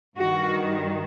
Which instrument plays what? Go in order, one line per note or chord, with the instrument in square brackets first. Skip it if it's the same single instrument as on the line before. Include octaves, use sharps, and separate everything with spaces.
[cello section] G2 D#3 F#4